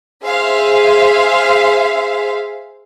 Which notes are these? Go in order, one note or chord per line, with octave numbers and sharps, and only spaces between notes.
G#4 C5 E5 F5